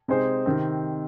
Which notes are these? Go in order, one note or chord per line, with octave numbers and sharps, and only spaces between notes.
C3 G#3 D#4 G#4 C5
C3 D#3 C4